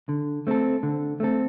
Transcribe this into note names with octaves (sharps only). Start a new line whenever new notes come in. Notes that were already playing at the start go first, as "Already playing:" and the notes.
D3
A3 C4 A4
D3
A3 C4 A4